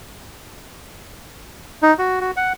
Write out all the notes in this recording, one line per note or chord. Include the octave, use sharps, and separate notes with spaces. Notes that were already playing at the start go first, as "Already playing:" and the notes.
D#4
F#4
F#4
F#5